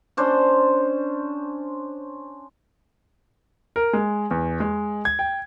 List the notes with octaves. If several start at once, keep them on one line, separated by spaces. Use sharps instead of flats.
C#4 D4 C5
A#4
G#3
E2
G#3
G#6
G5